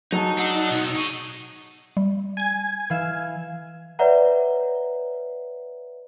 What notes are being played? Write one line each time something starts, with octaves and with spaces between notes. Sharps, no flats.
F#3 D#4 G#4 A4 A5
D4 D#5 F#5 E6
B1
D#4 G#4 C#6
G3
G#5 G#6
E3 F5 E7
B4 C#5 D5 E5 F#5 A#5